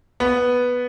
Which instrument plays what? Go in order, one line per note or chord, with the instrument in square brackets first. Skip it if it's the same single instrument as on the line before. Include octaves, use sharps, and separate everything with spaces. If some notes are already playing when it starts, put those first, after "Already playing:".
[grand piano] B3